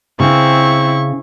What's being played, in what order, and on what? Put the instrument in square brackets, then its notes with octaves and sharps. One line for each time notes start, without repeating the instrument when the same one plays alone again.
[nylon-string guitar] C#3 [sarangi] C4 [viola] E4 [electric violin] C#6